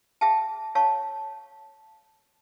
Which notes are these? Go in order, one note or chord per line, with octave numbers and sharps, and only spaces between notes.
G#4 E5 F5 G5 A5
C#5 F5 A5 C#6